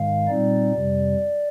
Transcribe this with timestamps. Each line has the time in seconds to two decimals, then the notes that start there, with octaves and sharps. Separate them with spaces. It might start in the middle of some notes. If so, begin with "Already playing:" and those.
Already playing: G#2 D#3 G#3 F5
0.28 A#2 G3 C4 D#4 D5
0.73 F2 C3 G3